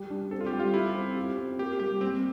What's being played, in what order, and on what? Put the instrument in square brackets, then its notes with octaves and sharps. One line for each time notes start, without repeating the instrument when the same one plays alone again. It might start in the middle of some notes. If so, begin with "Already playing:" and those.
Already playing: [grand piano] G3 G4
D4
[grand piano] C4 [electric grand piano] A4
[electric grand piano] F4
G4
[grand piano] G3
[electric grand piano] F4
[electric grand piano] E4 [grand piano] G4
[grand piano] C4
G4
C4
[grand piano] A#3 [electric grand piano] G4
[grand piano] G3 [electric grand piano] G4
[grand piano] G3 [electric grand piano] C4